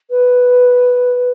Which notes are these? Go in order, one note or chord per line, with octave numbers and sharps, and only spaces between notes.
B4